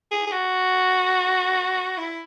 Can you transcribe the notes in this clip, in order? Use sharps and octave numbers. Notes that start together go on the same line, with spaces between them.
G#4
G#4
F#4
E4